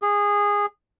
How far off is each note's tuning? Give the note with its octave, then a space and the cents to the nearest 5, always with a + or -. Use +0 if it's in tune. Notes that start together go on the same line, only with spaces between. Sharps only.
G#4 -20